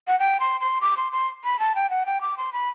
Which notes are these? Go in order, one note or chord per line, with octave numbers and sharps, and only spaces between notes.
F#5
G5
C6
C6
D6
C6
C6
B5
A5
G5
F#5
G5
D6
C6
B5